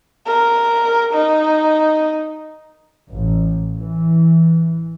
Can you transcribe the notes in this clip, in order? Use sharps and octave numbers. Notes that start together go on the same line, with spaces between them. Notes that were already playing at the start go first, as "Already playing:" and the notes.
A#4
D#4
A1
E3